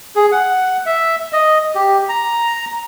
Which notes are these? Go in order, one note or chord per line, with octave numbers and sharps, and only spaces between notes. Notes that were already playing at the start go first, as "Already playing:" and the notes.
G#4
F#5
E5
D#5
G4
A#5